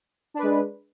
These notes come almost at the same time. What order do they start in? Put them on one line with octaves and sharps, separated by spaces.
D4 B4 G#3